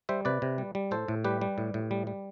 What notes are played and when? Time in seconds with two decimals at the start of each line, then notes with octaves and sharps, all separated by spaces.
0.09 G3 C5 E5
0.25 C3 B4 D5
0.42 C3
0.58 G3
0.75 G3
0.91 A2 A4 C5
1.08 A2
1.24 G3 G4 B4
1.41 G3
1.58 A2
1.74 A2
1.91 G3
2.07 G3